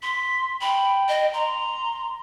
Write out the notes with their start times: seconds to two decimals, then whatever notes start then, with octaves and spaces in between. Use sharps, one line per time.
0.03 C6 B6
0.61 G5 B5
1.09 D#5
1.33 A#5 C6